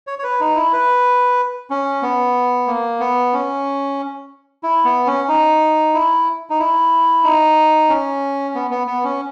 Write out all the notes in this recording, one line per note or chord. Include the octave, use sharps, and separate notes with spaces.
C#5
C#5
B4
D#4
E4
B4
C#4
B3
A#3
B3
C#4
E4
B3
C#4
D#4
E4
D#4
E4
D#4
C#4
B3
B3
B3
C#4